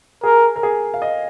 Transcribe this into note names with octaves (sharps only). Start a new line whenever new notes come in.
G#4 A#4
A#4
G#4
F5
D#5